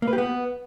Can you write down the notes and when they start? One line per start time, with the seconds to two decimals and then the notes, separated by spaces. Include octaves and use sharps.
0.02 A#3
0.08 B4
0.13 G4
0.18 B3